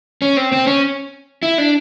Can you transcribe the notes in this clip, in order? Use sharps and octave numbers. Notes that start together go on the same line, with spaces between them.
C#4
C4
C4
C#4
E4
D4